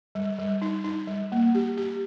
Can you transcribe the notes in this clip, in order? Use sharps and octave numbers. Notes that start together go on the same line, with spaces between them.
G3
G3
D#4
D#4
G3
A#3
G4
G4